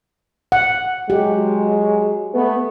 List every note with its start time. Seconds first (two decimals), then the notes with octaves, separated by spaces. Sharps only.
0.52 F#5
1.10 F#3 G#3 G4
2.34 A3 B3